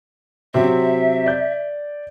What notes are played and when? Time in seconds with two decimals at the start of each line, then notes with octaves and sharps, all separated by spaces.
0.54 C3 F#3 C4 E5
1.26 D5 G6